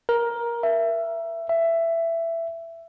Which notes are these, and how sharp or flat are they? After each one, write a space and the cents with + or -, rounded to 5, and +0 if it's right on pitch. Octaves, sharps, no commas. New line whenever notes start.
A#4 +15
E5 +20
E5 +15